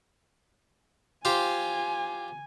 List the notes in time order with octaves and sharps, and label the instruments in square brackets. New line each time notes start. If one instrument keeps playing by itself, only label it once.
[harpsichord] F4 G4 C5 [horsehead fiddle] G#5